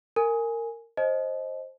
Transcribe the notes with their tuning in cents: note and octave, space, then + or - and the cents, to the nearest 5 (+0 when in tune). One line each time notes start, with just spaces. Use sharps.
A#4 -20 G#5 +0
C5 +15 D#5 +0 A5 -45